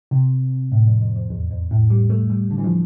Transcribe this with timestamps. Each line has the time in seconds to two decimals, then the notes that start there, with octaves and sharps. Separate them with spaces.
0.11 C3
0.72 A2
0.86 F2
1.01 F2
1.16 F2
1.30 E2
1.51 F2
1.71 A2
1.90 G3
2.10 A3
2.30 G3
2.51 D3
2.58 E3
2.64 F3